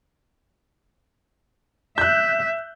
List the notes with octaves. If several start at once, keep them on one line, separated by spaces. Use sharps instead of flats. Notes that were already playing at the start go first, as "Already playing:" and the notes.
E5 F#6 G6